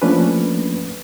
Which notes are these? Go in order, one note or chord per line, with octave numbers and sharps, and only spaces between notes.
F3 A3 A#3 C#4 D4 B4